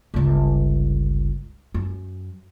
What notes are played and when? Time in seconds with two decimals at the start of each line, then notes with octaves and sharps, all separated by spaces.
0.14 G1 C#2
1.74 F#2